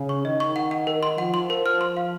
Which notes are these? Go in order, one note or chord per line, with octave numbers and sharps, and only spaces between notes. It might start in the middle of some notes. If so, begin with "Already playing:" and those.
Already playing: C#3
C#6
D#3 D#5
C#6
F#5
F#5
A#4
C6
F3 F#5
C6
A#4
F6
C6
F5